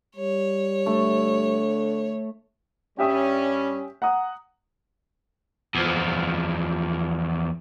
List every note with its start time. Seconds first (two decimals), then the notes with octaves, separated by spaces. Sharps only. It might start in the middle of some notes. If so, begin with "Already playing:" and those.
0.16 G3 C#5
0.86 D3 A3
2.99 G2 G3 C#4 G4 E5 D#6
4.02 F#5 A#5 D#6
5.75 E2 F3